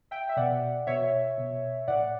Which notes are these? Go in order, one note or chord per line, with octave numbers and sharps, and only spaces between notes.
E5 G5
E5
B2 D5 F#5
B2 C#5 E5
B2
A2 D5 F#5